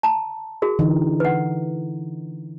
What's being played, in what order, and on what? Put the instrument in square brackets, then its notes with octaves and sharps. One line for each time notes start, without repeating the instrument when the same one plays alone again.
[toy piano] A5 A#5
F#4 G#4 A#4
[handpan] D3 E3 D#4
[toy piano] B4 F#5